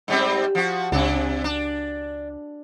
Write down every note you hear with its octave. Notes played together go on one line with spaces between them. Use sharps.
G#2 G3 C4
F3 F#4
C#2 C3 D4
D4